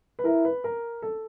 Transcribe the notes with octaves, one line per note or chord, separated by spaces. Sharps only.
B4
E4 A#4
B4
A#4
A4